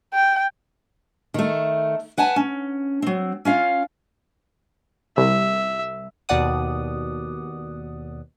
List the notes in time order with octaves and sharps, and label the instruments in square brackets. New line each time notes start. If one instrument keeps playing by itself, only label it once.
[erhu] G5
[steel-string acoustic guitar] D#3 A3
B4 F#5 G#5 A5
C#4
F#3 C4
C#4 F4 F5
[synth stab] C2 [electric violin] E5
[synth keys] D#2 B2 D5 F#5 D#6